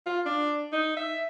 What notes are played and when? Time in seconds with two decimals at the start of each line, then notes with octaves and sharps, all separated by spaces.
0.06 F4
0.26 D4
0.73 D#4
0.97 E5